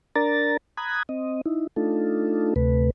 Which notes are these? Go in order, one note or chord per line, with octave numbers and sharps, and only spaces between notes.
D4 A#4 D5 A#5 A6
A#5 B5 D#6 F#6 G#6
C4 D#5
D#4 E4
A3 D4 D#4 F4 A4
D2 C3 A3 B4